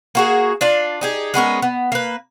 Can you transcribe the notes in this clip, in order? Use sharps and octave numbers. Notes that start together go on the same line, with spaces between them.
A#3 F#4 G#4
D4 F4 D5
D#4 G4 G#4
G#3 B3 C#4 A#4
B3
A#3 B4